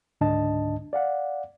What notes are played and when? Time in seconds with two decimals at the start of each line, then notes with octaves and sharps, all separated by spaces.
0.21 C#2 G#2 D3 D4 D#5 A5
0.93 D5 F5 F#5